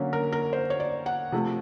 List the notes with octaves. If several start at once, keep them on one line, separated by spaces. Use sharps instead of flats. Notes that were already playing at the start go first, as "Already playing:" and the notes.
Already playing: D3 F#3 A#3 C#4
A#4
A#4
C5
C#5
D5
F#5
C3 F3 A3